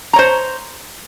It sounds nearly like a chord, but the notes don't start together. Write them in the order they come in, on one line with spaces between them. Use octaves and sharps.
A#5 C#5 C5